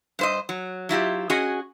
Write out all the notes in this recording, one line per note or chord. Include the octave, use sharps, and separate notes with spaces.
G2 C5 D#5
F#3
F#3 E4 F4 G4
C#4 F#4 G#4 D#5 G#5